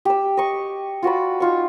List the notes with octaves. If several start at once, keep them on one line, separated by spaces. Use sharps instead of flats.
G4 E6
D#5 C#6
F4 F#4 D5 B5
D#4 F4 C#6